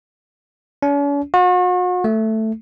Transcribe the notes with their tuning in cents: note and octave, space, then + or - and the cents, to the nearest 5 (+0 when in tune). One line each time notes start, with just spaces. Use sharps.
C#4 +45
F#4 -40
A3 +5